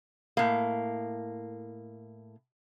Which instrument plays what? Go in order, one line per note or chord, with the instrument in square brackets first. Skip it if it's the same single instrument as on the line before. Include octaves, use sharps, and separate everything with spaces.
[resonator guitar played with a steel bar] A2 A#3